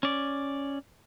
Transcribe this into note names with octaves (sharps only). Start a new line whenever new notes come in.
C#4 D5